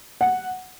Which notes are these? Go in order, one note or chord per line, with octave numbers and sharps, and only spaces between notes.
F#5